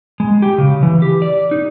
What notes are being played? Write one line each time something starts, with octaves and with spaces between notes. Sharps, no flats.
G#3
G4
C#3
E3
G4
D5
D#4